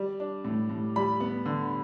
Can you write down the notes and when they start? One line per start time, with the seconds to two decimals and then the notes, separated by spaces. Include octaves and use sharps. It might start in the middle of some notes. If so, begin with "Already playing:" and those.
Already playing: G3
0.20 D4
0.45 A2
0.69 A2
0.96 G3 B5
1.20 B3
1.45 D3